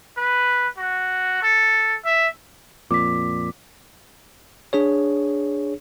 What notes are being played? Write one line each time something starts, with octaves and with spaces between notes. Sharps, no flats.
B4
F#4
A4
E5
F2 A#2 D6 B6
D4 G#4 C#5